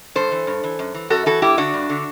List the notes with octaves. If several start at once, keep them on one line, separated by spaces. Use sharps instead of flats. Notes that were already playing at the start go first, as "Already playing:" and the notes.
G2 A4 C5
E3
G2
E3
F#2
E3
F#2 F#4 A4
E3 F#4 A4
G2 E4 G4
D3 D4 F#4
G2
D3